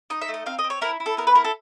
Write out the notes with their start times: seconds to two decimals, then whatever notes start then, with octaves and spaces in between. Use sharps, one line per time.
0.10 D#4 D#5
0.22 E5
0.29 A3
0.34 D#5
0.46 C4 F5
0.59 D#5
0.64 C4
0.70 C#5
0.81 E4 A#4
1.00 E4
1.06 A4
1.17 B3 A#4
1.27 B4
1.35 E4 A#4
1.45 A4